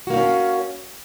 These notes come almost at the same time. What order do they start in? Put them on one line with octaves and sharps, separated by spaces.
F#4 A#3 D#4 C#4